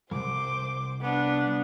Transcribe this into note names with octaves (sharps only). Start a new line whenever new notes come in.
C2 F2 C5 D6
B3 D4